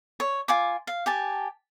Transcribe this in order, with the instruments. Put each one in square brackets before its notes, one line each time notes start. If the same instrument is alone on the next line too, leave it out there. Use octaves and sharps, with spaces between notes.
[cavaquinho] C#5
F4 G#5 D6
F5
G4 G#5 A5